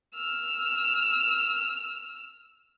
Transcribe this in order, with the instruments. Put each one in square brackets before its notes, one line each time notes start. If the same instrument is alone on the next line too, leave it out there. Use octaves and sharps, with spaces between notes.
[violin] E6 F6